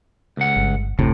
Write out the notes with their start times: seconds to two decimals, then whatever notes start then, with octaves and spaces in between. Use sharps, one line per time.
0.37 C#2 F#5
0.56 G1
0.99 F#1 D2 A2 C3